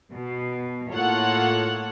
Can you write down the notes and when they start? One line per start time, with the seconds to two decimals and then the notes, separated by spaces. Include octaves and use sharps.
0.12 B2
0.93 A2 A#3 F4 A4 C#5 F#5